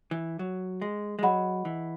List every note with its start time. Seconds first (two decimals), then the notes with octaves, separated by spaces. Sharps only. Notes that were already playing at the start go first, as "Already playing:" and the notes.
0.11 E3
0.39 F#3
0.82 G#3
1.19 G#3
1.23 F#3 G#4 D#5 F#5 B5
1.65 E3